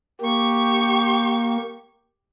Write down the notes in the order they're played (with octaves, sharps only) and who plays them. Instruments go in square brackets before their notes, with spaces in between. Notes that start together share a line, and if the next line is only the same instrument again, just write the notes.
[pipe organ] A#3 [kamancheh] G4 C#6